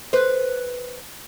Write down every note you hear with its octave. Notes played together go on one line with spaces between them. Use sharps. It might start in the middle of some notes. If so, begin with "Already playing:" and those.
B4 C5